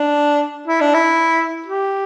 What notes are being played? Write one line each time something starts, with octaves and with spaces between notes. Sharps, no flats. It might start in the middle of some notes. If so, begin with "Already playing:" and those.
Already playing: D4
E4
D4
E4
G4